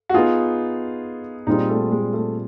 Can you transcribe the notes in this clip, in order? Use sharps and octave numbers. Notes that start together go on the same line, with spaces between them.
F#4
B3 D#4 F4 G#4
A#2 G3 C4 D#4 F4 G#4
A3
G#3
A3